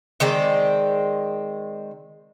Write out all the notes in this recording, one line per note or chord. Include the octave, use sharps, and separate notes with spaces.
D#3 G#3 C4 D5